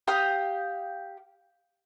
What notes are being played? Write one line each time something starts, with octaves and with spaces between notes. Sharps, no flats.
G4 F5 D#6